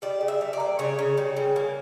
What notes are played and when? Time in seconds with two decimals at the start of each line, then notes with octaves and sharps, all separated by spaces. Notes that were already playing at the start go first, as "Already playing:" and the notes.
0.02 G3 D5
0.21 C#3
0.28 E5
0.41 G3
0.53 D5
0.60 A#3
0.79 C#3 C#5
0.99 C#3
1.17 G3
1.36 C#3
1.56 A#3